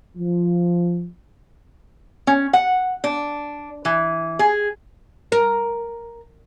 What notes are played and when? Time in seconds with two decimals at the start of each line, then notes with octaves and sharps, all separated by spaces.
0.17 F3
2.27 C#4
2.53 F#5
3.04 D4
3.85 E3
4.39 G#4
5.32 A#4